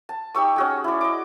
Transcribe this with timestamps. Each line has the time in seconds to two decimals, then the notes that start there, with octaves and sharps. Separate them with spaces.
0.09 A5
0.35 D#4 G4 C#6 E6
0.56 C#4 F#4 G#4
0.84 E4 D5
1.01 D#5 D6